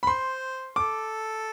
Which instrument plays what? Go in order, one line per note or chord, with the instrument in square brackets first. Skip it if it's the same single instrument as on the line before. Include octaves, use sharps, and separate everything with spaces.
[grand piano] B5
[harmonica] C5 [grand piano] C6
[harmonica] A4 [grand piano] D6